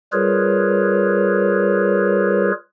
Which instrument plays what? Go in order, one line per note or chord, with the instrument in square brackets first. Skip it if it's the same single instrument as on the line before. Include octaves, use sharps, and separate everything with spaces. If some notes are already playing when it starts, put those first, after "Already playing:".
[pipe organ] G3 F4 G#4 A#4 B4 C#5